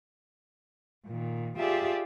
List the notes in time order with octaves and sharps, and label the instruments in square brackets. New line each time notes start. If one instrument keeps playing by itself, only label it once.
[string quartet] A#2 D#3
F4 G4 G#4 D5 E5 A5